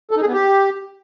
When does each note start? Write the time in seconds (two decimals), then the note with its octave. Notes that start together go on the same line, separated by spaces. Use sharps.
0.11 A4
0.17 D#4
0.22 G#4
0.27 B3
0.33 G4